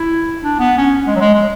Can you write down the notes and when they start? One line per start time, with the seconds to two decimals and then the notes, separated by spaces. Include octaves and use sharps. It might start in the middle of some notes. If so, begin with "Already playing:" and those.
Already playing: E4
0.43 D4
0.59 B3
0.78 C#4
1.07 G#3
1.16 F#3
1.21 G#3
1.34 G#3